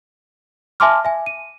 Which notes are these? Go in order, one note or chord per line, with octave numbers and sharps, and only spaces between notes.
E5 G#5 A5 C6 D6 F6
E5 G#5
D#7